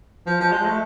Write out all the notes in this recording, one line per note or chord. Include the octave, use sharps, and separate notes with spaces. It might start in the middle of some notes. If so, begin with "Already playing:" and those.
F3
F3
G#3
A3